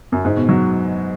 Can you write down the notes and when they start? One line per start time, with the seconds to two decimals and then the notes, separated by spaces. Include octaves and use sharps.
0.12 F#2
0.25 G#2
0.36 B2
0.49 F#3